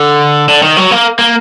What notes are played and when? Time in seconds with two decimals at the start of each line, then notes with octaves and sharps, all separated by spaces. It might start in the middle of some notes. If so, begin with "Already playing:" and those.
Already playing: D3
0.49 D3
0.63 D#3
0.77 F#3
0.91 A#3
1.19 A#3